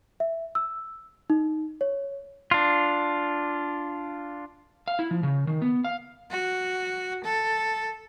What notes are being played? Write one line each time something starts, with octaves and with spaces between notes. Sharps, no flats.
E5
E6
D#4
C#5
D4 F4
F5
E4
F3
C#3
D#3
B3
F5
F#4
A4